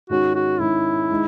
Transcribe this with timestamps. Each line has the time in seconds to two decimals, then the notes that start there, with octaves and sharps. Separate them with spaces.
0.09 G#2 D#3 G#3 C#4 F#4
0.35 F#4
0.60 G#2 D#3 G#3 C#4 E4
1.12 D#3 G#3 D#4